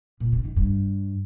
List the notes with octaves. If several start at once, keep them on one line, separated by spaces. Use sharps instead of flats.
A#2
C#3
D#3
G2